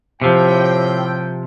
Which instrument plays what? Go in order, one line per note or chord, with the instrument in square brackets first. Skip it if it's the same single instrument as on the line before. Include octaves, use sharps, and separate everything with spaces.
[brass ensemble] A2 G5 [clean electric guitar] C3 F3